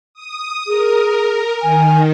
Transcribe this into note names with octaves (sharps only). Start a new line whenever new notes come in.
D#6
G#4 A#4
D#3 G#5